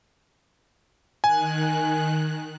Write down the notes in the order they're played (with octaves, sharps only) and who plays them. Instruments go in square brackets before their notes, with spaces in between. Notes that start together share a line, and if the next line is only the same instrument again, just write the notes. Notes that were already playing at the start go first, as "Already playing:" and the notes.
[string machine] D#3 F#6 [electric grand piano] G#5